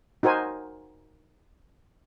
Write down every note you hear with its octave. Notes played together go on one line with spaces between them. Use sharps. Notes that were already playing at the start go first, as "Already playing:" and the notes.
D#4 F#4 A#4 C5 G#5